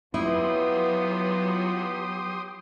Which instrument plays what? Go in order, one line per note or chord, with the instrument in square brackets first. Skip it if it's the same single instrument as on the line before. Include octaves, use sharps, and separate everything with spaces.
[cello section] F#3 [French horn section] B3 F4 [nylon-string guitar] E4 [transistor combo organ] G4 C6 D#6